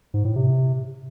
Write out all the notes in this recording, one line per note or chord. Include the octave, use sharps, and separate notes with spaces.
G#2
A2
C3